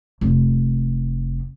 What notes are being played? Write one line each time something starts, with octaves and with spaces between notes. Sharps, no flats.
F1